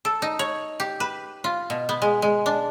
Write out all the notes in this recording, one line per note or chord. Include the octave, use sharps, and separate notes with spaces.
A4
D#4
C#5
G4
B4
F4
B2
B3
G#3
G#3
D4